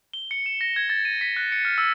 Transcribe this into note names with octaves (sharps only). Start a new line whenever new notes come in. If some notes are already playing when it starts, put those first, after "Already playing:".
G7
C#7
E7
A#6
G#6
A6
D#7
B6
F#6
C#7
F6
E6